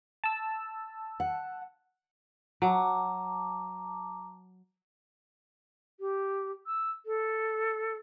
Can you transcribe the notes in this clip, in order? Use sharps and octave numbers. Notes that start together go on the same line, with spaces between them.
A5 E6
F#5
F#3 A5 A#5 D6
G4
E6
A4